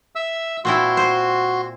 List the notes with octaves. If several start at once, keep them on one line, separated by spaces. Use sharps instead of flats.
E5 E6
A#2 C4 E4 F#4 C6
C5